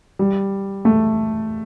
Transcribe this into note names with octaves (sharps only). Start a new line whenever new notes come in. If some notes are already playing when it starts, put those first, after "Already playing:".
G3
A3